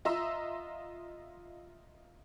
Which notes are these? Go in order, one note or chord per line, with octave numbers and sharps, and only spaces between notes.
F4 D#5 E5 A#5 C6 E6